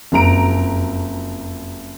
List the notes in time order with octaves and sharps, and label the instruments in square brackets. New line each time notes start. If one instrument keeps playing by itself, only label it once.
[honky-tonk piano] F#1 F2 A#5 D7